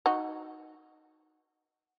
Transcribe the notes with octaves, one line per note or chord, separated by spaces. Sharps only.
D#4 F#4